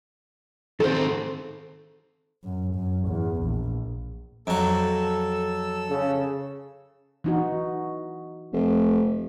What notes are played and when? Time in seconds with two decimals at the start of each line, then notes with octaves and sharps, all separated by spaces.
0.80 D#3 C4 A4 C5
2.44 F#2
2.74 F#2
3.07 E2
3.43 A#1
4.47 F2 F#3 A4 E6
5.90 C#3
7.24 E3 D#4 F#4
8.52 F1